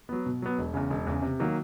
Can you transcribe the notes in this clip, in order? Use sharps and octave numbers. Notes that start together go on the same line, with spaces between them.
F#3 B3
B2
F#3 B3
E1
E2 C#3
E1
E2 C#3
C3
D#3 F#3 A#3